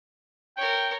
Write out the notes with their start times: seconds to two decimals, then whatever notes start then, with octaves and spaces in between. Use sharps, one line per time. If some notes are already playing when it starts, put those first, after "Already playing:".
0.57 A#4 C#5 G5